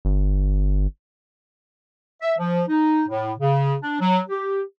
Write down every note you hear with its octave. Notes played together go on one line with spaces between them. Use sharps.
G1
E5
F3
D#4
A2
C#3
D4
F#3
G4